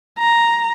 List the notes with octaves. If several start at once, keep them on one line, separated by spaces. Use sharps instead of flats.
A#5